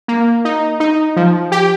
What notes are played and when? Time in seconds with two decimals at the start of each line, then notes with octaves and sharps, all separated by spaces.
0.08 A#3
0.45 D#4
0.80 D#4
1.16 F3
1.52 G4